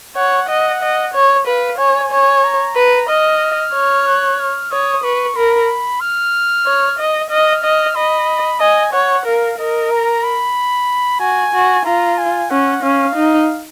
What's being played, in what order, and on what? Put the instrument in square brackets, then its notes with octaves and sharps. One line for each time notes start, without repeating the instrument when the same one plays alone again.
[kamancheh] C#5 [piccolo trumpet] F#5
[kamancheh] D#5 [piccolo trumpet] F#5
[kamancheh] D#5
C#5
[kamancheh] B4 [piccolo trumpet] F5
[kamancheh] C#5 [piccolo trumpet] G#5
[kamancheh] C#5
[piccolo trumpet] A#5
[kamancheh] B4
[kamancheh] D#5 [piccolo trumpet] F6
[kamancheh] C#5
[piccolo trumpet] F#6
F6
[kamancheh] C#5 [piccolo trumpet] D#6
[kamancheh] B4 [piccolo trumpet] C#6
[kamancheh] A#4 [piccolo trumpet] B5
[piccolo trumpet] F6
[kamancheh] C#5
D#5
[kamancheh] D#5 [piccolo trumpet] F6
[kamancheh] D#5
[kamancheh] D#5 [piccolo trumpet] B5
[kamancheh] D#5 [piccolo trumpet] G#5
[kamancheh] C#5 [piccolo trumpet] F#5
[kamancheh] A#4 [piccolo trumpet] F5
[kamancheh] A#4 [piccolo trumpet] D#5
[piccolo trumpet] A#5
B5
[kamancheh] F#4 [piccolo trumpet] G#5
[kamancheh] F#4
[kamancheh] F4 [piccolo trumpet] A#5
[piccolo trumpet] G#5
[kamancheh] C#4 [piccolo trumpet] F#5
[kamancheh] C#4 [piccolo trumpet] F5
[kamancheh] D#4